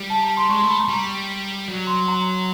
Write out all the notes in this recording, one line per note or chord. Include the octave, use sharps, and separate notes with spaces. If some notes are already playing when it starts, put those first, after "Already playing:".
Already playing: G3
A5
A#5
C6
G#3 C#6
C6
A3
B5
A#5
G3
F#3
C6
A#5